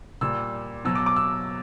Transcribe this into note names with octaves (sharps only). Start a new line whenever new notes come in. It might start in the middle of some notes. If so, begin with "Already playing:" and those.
A#2 G3 E6
B2 F#3 E6
D6
D6
E6